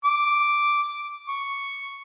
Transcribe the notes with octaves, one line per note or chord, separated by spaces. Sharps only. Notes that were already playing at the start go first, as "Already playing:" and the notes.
D6
C#6